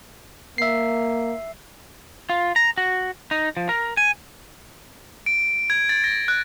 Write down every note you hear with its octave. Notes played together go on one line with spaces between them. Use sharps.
A#3 E5 C7
F4
A#5
F#4
D#4
F3
A#4
G#5
D7
G#6
A6
A#6
F#6